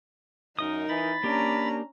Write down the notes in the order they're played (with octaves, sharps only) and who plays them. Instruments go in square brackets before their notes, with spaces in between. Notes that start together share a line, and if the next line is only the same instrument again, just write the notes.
[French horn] F#2 [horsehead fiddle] D#4 [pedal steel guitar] A#4 D#5 D#6
[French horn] E3 [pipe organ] B5 A6
[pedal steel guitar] A#3 G4 [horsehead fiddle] C#4 A#5 [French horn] D4